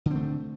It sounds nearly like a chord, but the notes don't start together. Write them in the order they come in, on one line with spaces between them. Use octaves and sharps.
D3 C4 A3